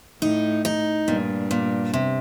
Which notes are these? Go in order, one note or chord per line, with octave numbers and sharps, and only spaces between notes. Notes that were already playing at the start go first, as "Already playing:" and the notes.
A2 D#4
D#4
G2 A#2
A#2
C3